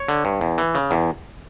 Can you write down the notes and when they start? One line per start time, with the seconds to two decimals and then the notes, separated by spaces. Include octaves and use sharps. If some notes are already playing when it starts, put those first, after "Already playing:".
Already playing: C#5
0.08 D3
0.25 G2
0.41 E2
0.58 E3
0.75 C#3
0.91 E2